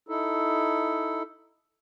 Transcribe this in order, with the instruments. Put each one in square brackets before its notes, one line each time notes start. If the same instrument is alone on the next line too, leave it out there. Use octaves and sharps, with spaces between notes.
[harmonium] D#4 E4 A4